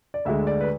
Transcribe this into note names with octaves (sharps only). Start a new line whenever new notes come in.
D5
D2 D3 G#3 E5
D5
B4